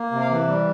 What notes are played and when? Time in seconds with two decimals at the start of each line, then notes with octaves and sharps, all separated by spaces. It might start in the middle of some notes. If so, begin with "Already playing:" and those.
Already playing: A#3
0.11 C3
0.20 F5
0.30 E3
0.48 G3